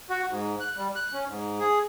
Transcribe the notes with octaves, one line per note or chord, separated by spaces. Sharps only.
F#4
G#2
F#6
G3
F#6
C#4
G#2
G#4